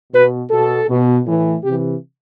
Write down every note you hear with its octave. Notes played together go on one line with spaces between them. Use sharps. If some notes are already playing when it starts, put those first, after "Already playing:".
B2 B4
B2 A4
B2
A2 E3
C3 E3 G4